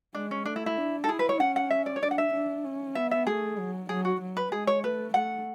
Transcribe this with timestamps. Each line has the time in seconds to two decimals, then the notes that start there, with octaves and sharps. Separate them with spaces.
0.15 G#3 D4
0.31 C#4
0.45 A3 D4
0.56 E4
0.66 E4
0.77 D4
1.04 A4
1.08 E4 G#4
1.19 B4
1.29 C#5
1.40 C#4 F#5
1.56 F#5
1.70 E5
1.86 D5
1.96 C#5
2.03 D4 D5
2.11 F#5
2.18 E5
2.33 D4
2.65 C#4
2.95 B3 E5
3.11 E5
3.27 A3 G#4
3.58 F#3
3.89 F#3 G#4
4.05 F#4
4.21 F#3
4.37 B4
4.52 G#3 G#4
4.67 C#5
4.83 A3 B4
5.14 A3 F#5